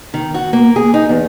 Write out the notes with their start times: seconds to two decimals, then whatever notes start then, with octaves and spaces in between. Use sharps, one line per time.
0.14 D#3
0.34 F#4
0.53 A#3
0.76 G#4
0.94 D#4
1.09 E2